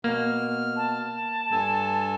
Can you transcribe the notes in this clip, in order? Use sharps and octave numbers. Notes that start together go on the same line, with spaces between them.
B2 A#3 F6
A5
G2 A4 G#5